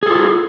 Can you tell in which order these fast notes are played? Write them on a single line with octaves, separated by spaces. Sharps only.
G#4 A4 F4